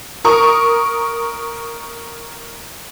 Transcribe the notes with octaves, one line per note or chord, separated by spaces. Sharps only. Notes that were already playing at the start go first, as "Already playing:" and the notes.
A#4 C#6 D#6